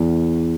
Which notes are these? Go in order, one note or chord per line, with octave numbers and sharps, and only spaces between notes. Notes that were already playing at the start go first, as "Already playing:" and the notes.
Already playing: E2